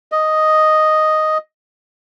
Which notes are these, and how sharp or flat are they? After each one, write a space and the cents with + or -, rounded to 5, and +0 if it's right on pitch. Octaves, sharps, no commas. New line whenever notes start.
D#5 +0